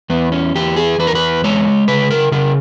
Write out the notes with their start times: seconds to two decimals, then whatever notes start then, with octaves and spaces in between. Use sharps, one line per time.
0.10 E2 B3
0.32 C#4
0.55 E2 G4
0.76 G#4
0.98 E2 B4
1.07 A#4
1.15 B4
1.44 G#3 C#5
1.88 C#3 B4
2.11 A#4
2.32 C#3 A#4